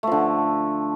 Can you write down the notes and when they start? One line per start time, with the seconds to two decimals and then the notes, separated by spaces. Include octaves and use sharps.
0.03 A3
0.07 F3
0.12 D3